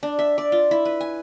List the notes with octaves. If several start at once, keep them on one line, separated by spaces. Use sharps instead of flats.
D4
E5
D5
F4
E4
B4
G#5